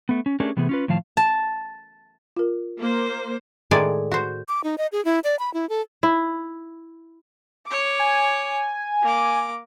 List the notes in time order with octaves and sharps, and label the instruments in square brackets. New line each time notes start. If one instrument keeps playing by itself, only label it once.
[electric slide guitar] A3 B3
C#4
A3 C#4 D4 G4 G#4 A#4
C3 E3 A3 B3 G#4
C#4 F4 B4
A2 D#3 F3 F5 A5
[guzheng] A5
[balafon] F4 A#4
[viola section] A#3 C5
[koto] A2 D#3 G#3 G#4 D5 G#5
F#4 C5
[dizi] D6
D#4
D#5
G#4
E4
D5
B5
E4
A4
[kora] E4
[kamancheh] C#5 D6
[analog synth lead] G#5
[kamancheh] A#3 D6